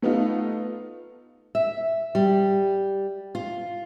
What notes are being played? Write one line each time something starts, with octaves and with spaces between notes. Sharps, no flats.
A3 B3 D#4 F4
E5
G3
F4